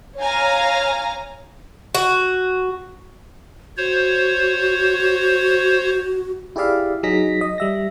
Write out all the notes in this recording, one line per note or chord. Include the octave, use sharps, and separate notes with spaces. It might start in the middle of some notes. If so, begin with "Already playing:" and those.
C#5 F5 G#5 A#5
F#4
F#4 C5 C#5
E4 G4 G#4 D5 E5 F5
F#3 D#4 G#4 A#6 B6
D#5
G3 E5 A#6